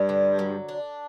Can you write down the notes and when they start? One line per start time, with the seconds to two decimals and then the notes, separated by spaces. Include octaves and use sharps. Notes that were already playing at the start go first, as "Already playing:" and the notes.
Already playing: G2 G3
0.09 D3
0.39 F#3
0.69 D4